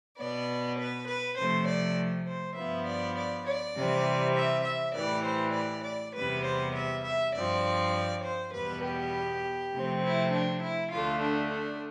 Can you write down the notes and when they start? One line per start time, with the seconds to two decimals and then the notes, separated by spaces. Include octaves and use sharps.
0.18 B2 B3 D5
0.78 B4
1.08 B4
1.38 C3 F3 A3 C5
1.67 D5
2.27 C5
2.57 G2 F3 B3 E5
2.87 D5
3.17 D5
3.46 D5
3.76 C3 E3 G3 C4
4.35 E5
4.66 E5
4.95 A2 E3 G3 D5
5.25 C5
5.55 D5
5.85 D5
6.15 E2 C3 G3 B3 B4
6.45 C5
6.75 E5
7.05 E5
7.35 G2 F3 C4 D5
8.23 C5
8.54 E2 B2 G3 B3 B4
8.84 G4
9.73 C3 F3 A3 C4
10.03 E4
10.33 D4
10.63 E4
10.93 D2 D3 A3 F4
11.22 D4
11.52 D4